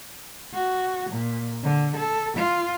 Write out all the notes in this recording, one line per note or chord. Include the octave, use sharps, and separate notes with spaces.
F#4
A#2
D3
A4
F4